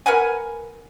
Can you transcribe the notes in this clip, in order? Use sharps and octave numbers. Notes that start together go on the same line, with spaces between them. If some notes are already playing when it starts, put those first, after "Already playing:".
A#4 B4 F#5 G#5